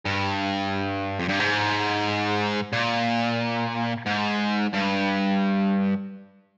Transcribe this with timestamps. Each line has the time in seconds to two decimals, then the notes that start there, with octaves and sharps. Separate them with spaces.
0.06 G2
1.19 F2
1.28 G2
1.39 G#2
2.73 A#2
4.06 G#2
4.74 G2